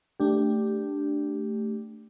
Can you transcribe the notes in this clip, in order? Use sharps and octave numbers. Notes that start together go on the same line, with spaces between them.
A3 D4 G4